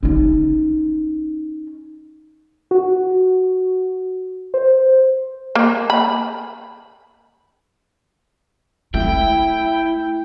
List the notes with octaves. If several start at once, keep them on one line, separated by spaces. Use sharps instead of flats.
C#4 D#4
F#4
C5
A#3
B5
A3 E4 G5